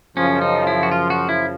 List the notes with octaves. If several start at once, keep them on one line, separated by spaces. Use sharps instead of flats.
F#2 C#3 F3 C#4
D#4
E4
F#4
F4
F#4
E4